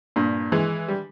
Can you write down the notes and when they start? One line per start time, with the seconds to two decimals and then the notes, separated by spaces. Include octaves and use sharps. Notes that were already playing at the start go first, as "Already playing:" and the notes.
0.16 G2 A#2
0.52 E3 G#3
0.88 G3